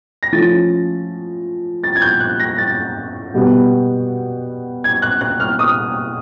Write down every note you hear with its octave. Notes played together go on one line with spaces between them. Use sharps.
A#6
F3 A3 C#4 E4 A6
A6
G#6
G6
F#6
A#6
A6
B2 G3 B3
G#6
F#6
F#6
F6
D#6